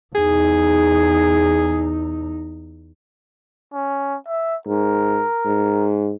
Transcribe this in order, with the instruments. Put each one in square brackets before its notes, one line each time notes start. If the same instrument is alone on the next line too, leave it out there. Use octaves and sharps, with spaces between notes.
[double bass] E2 D#4 [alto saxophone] G#4
[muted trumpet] C#4
E5
[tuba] G#2 [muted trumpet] A#4
[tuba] G#2